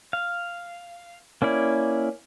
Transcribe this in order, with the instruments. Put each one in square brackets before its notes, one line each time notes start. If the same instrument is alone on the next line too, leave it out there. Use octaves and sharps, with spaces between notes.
[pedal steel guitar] F5
A#3 C#4 E4 D5